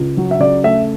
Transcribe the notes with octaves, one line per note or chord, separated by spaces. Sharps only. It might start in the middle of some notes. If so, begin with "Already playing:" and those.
Already playing: C#2
F#3
E5
C#3 D5
A3 E5